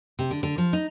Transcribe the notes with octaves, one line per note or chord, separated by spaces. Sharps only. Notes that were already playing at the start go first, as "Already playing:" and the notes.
C3
D3
D3
F3
D#4